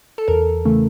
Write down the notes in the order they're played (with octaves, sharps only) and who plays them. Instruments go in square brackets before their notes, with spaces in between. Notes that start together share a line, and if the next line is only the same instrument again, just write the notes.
[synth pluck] A4
E2 A#4
C#3 E3 A3